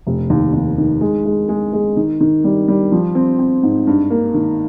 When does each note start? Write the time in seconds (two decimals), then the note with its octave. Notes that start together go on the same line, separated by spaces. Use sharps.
0.07 F1
0.30 D#2
0.53 D#2
0.78 D#3
1.01 G#3
1.25 G#3
1.49 G#3
1.73 G#3
1.97 D#3
2.21 D#3
2.44 G3
2.68 G3
2.92 F3
3.15 C4
3.39 C4
3.63 G#2
3.87 G2
4.10 A#3
4.34 D#3